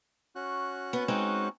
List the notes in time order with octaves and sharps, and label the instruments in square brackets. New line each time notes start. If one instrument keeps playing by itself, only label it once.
[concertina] C#4 F#4 F#6
[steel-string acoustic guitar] B3
G#3 C4 D#4